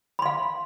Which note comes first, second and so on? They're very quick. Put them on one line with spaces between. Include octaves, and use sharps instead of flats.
B5 C6 F5